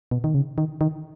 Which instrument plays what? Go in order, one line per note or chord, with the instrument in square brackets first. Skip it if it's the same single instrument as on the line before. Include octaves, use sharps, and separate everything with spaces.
[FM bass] B2
D#3
C#3
D#3
D#3